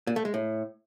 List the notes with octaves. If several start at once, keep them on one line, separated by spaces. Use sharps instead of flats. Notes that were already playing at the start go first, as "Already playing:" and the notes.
A#2
A3
G#3
A2